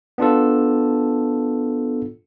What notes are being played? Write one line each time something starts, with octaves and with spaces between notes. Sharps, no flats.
B3 D4 F4 A4